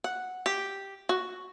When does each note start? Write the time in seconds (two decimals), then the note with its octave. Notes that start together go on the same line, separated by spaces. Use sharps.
0.04 F#5
0.46 G4
1.09 F#4